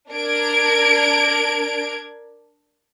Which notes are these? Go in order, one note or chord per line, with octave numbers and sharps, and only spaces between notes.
D4 A#4 G#6 D7